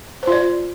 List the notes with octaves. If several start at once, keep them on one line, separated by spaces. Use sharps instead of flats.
F4 C5 D5